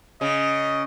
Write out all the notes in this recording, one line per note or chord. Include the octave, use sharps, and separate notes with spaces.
C#3 D#5